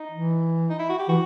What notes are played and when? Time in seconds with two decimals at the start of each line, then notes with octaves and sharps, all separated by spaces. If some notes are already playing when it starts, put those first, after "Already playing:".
Already playing: D#4
0.11 E3
0.70 D#4
0.79 E4
0.89 F#4
0.98 G4
1.08 E3 F#4